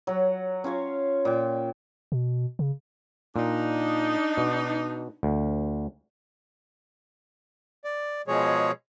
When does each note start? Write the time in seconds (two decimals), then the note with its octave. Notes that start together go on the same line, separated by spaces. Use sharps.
0.07 F#3 F#5
0.64 C#4 F4 C#5 F5
1.25 A#2 G5
2.12 B2
2.59 C#3
3.36 A#2 D4 D#4
4.38 B2
5.23 D2
7.84 D5
8.28 B2 F3 G#3 G#4 C#5